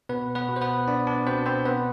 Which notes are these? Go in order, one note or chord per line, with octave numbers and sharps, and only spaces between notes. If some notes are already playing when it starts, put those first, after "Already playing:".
B2 B3 B4
B3 B4
B2
C5
B3 B4
B3 D4 D5
D4 D5
B2 C4 C5
C4 C5
B3 B4